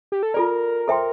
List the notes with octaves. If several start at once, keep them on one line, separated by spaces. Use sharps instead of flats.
G4
A4
F4 A4 A#4 D5
A4 C5 E5 G5 C6